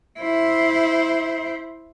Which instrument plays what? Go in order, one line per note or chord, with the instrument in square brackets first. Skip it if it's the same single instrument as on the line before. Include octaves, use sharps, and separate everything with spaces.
[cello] E4 C5